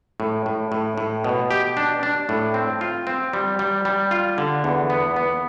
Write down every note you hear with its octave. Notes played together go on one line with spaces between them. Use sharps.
A2
A2
A2
A2
B2
G4
D4
D4
A2
C4
F4
C4
G3
G3
G3
F4
D3
E2
B3
B3